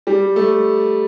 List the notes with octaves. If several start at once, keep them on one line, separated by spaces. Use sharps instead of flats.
G3
A3